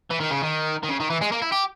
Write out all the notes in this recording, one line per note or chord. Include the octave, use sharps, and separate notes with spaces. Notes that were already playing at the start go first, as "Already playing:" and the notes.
E3
D#3
C#3
D#3
D#3
C#3
D#3
E3
G#3
A#3
E4
G4